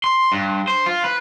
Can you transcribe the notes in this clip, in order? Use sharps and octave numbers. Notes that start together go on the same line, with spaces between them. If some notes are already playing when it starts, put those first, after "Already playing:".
C6
G2
C5
F4
B4